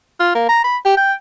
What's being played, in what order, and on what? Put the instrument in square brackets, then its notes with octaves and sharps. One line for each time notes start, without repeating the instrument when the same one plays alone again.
[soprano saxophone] F4
A#3
A#5
B5
G4
G5